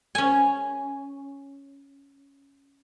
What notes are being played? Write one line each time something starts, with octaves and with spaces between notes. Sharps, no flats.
C#4 G#5